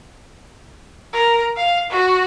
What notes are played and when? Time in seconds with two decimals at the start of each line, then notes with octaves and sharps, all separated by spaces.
1.13 A#4
1.57 F5
1.90 F#4